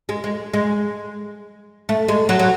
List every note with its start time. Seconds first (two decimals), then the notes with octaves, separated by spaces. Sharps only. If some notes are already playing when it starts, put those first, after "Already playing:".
0.09 G#3
0.24 G#3
0.54 G#3
1.89 A3
2.08 G#3
2.29 F#3
2.39 F#3